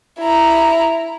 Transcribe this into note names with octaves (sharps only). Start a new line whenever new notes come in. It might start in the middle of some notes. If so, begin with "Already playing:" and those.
E4 A#5